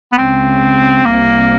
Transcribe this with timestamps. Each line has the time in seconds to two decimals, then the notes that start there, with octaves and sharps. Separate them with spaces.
0.13 B3
0.17 C#2 C#3 C4
1.04 C2 C3 A#3